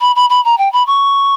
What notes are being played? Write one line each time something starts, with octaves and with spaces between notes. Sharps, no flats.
B5
B5
B5
A#5
G5
B5
C#6